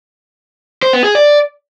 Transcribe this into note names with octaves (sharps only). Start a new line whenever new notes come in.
C5
B3
G#4
D5